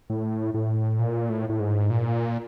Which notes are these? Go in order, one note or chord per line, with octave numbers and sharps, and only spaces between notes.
A2
A2
A#2
A2
A2
G#2
A#2